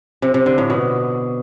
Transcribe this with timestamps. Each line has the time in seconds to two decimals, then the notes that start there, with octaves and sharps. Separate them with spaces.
0.22 C3
0.34 C3
0.46 D3
0.58 A2
0.70 B2